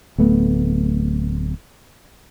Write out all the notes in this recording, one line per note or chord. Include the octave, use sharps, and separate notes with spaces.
D1 A3 B3